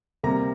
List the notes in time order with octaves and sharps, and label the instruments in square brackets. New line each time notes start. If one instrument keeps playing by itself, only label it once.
[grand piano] C3 G3 A#3 A#5